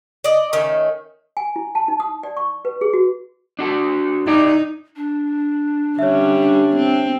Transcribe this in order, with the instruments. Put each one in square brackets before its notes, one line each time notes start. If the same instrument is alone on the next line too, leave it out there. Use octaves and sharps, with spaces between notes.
[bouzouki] D5 D#5
D#3 A3 C#4
[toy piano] G#5
E4
A5
D#4
D#6
D5
C#6
B4
G#4
F#4
[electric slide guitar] D4 F#4 A4
[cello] D#4 [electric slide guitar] E4 G4 D5
[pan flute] D4
[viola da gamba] D3 G3 C#4 [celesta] C#5 E5
[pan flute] D4
[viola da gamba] C4